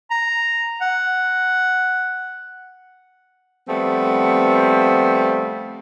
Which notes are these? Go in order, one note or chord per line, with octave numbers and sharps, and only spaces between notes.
A#5
F#5
F3 G3 A3 B3 C4